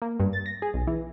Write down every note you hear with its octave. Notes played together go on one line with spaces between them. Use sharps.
A#3
G2
A6
A#6
G#4
B1
E3